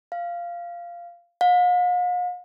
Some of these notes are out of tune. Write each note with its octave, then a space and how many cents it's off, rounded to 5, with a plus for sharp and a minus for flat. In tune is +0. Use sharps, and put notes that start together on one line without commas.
F5 -10
F5 +45